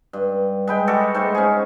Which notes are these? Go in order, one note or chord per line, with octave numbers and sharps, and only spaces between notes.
G2
G#3 B4 G5
G3 F#4 A4
G#2 A3 C5
C#4 G#4